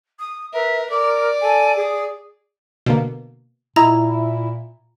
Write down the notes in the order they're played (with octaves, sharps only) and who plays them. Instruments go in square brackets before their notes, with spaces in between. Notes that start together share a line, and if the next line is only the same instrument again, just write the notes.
[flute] D#6
[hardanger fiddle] A#4 [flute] B4 [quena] E5
[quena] A#4 [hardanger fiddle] D5 [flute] D6
[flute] A4 [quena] G#5
[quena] G#4 [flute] D#6
[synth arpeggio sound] B2 D3 A#3
[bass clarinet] A#2 [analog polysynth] E4 [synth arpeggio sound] D#5 [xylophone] A#5